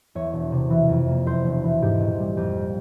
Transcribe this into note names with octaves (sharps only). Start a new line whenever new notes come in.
E2 C#5
E1
C3
E3
F2
A#3
E2 C5
E1
E3
G#2 G4
A#1
G3
F2 G4